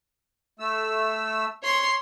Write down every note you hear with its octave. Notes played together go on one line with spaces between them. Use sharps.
A3 E6
C#5 C6